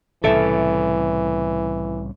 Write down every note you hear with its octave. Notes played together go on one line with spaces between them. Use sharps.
C2 A2 C#3 E3 A4 E5